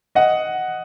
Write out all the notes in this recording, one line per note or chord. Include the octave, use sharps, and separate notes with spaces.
D#5 F#5